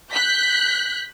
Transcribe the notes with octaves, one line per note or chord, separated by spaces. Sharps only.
F#6 G6 B6